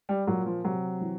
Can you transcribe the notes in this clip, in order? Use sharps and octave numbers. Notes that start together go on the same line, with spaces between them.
G3
A#2 F#3
F3
C3 F#3
E3